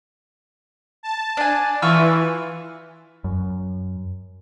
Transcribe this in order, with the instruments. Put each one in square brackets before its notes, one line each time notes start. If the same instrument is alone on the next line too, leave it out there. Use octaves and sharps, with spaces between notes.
[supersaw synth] A5
[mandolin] D4 G#5
[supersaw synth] E3 [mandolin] F4 C#6 E6
[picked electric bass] F#2